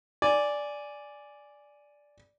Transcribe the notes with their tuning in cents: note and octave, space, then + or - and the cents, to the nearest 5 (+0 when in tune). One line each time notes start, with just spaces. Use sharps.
D5 -5 G#5 +0